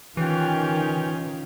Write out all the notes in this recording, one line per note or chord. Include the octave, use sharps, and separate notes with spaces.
D#3 E3 C#4 F4 G4